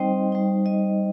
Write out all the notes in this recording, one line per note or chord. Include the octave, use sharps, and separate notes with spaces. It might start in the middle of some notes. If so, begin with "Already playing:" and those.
Already playing: G3 C4 D#4 C5 D#5 G5
G3 D#4
D#5